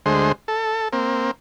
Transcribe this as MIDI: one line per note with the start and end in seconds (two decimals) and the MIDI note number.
0.06 0.32 38
0.06 0.32 56
0.06 0.32 72
0.48 0.88 69
0.93 1.31 58
0.93 1.31 60